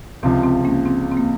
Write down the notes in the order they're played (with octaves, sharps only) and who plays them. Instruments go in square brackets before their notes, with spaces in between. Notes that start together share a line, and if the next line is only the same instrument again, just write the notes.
[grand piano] C#2 C3 F3 [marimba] C4
[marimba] C4
A#3 C#4
C4
C4
A#3